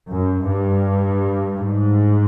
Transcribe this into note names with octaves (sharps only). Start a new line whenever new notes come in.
F#2
G2
G#2